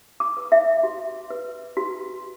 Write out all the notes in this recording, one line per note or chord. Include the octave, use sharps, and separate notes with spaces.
D6
B4
E5
F#4
B4
F#4